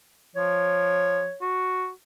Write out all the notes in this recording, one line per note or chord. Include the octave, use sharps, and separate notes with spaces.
F3 C#5
F#4